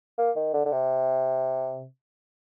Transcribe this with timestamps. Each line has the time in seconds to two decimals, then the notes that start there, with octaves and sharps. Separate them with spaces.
0.18 A#3
0.36 D#3
0.54 D3
0.66 D3
0.72 C3